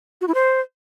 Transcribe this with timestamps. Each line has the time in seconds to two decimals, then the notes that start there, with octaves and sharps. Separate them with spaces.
0.21 F#4
0.28 E4
0.35 C5